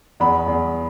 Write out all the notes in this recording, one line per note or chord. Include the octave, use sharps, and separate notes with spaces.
E2 B5
E2